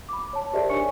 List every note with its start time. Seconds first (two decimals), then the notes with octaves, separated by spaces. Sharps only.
0.09 B5 D6
0.33 C#5 A5
0.53 G4 G#4 A#4 C5 D5 E5
0.69 D4 D#4 C#5 G#5 C#6 C#7